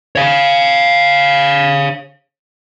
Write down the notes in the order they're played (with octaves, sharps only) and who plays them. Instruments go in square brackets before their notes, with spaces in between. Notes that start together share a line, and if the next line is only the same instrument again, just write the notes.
[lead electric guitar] C#5 F5